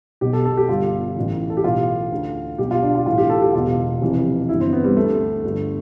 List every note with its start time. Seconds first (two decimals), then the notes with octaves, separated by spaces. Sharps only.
0.21 B1 B2 G4
0.33 A4
0.45 A4
0.57 G4
0.68 G1 G2 D3 F4
1.16 A1 A2 E3
1.50 A4
1.57 G4
1.64 B1 A2 E3 F4
2.12 D2 D3
2.58 B1 B2 G4
2.71 F4
2.83 D4
2.95 F4
3.06 B1 A2 E3 F4
3.18 G4
3.30 A4
3.42 G4
3.53 E1 E2 B2 F4
4.01 F1 F2 C3 E3
4.49 G1 G2 E3 E4
4.61 C4
4.73 B3
4.84 G3
4.96 D2 D3 A3
5.43 G1 G2 D3